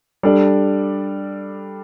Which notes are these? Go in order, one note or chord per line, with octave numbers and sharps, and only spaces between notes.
G3 D4 A4 D5